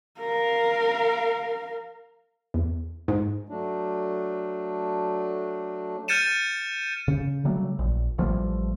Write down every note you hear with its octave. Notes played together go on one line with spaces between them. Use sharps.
A#4 F5
E2
G#2
F#3 A3 D4
F6 G6 A6 C#7 D#7 E7
C#3
C#3 F#3 G3 A3
A#1
A1 F3 G3 A3